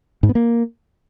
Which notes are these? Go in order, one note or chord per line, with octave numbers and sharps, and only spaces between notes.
G#2
B3
A#3